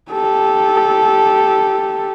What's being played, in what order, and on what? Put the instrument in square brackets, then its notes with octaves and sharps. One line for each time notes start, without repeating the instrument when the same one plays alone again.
[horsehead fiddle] G4 A4